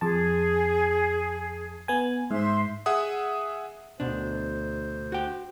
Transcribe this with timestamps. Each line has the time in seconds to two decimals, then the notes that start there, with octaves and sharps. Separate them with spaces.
0.01 F2 G#4 A5
1.88 B3 G#5
2.31 G#2 C5 E5 C6
2.86 G#4 E5 F#5 D#6
4.00 D2 B2 D4 C5
5.12 F#4 G5